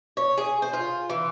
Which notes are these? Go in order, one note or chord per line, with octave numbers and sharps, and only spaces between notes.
C#5
G#4
C5
F4
E3